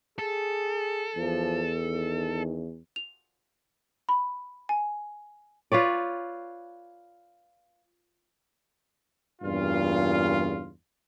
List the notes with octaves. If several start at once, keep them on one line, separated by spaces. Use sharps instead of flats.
G#4 A4
E2 F3
D#3
F7
B5
G#5
F4 B4 C#5 D5
E2 G2 A#2 C#3 F4